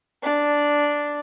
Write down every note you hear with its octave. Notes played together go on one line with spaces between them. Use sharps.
D4